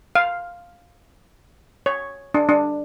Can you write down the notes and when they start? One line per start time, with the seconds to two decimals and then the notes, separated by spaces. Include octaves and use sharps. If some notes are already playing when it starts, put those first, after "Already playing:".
0.15 F5
1.86 C#5
2.34 D4
2.49 D4